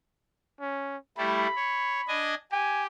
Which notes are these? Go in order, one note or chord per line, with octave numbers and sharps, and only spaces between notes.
C#4
G3 A3 E4 B5
C#5
D4 D#5 G#5
G4 G#5